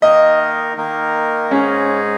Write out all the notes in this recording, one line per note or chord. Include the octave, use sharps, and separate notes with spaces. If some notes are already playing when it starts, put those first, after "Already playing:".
D#3 A#3 D#4 A#4 D#5
D#3 A#3 D#4 A#4
G#2 G#3 C#4 D#4 G#4